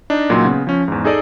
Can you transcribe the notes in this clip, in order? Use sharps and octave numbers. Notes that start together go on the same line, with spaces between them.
D4 D#4 D#5
C#2 A#2 F#3 D#4 C6
C#3 B3
F3 C#4
E2 G#2
D#4 G#4 A4 D5 D#5